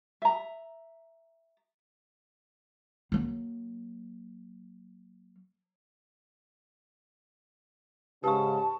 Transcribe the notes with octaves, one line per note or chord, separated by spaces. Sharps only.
E5 A#5
F#3 A#3
G#2 C#3 G4 A5 C#6